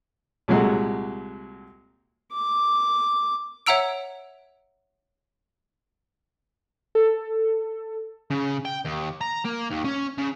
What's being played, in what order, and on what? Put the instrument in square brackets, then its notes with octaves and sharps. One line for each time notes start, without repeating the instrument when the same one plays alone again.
[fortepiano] C2 A#2 F#3 G#3 F#4 A4
[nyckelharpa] D6
[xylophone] C#5 E5 F#5 A#5 E6 D7
[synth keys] A4
[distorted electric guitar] C#3
G5
D#2
A#5
A#3
D#2
C#4
C#3